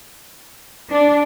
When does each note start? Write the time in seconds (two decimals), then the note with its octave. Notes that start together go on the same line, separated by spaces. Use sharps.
0.90 D4